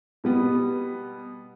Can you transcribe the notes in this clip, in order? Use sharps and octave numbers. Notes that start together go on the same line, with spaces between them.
B2 G3 B3